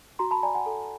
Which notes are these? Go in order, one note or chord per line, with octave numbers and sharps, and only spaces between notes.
F#4 A#5 C6
A5 B5
D5 G#5 A#5
F#5 G#5
A4